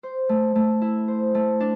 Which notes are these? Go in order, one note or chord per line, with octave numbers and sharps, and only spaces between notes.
C5
A3
A3
E4
C5
A3
D4